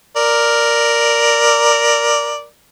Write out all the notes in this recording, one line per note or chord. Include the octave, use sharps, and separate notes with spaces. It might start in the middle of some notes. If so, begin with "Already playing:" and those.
A#4 D5